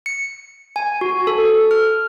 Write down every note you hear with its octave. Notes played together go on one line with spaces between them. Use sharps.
C#7
G#5
F#4
A4
F6